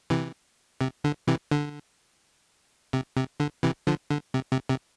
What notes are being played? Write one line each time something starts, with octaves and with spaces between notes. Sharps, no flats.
C3 E3
C3
D3
C3 E3
D3
C3
C3
D3
C3 E3
D3 F3
D3
C3
C3
C3